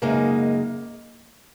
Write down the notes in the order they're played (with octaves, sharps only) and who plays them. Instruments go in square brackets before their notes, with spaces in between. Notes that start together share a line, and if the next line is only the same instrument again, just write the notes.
[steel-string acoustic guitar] F#2 C#3 G#3 D#4 [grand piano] A#3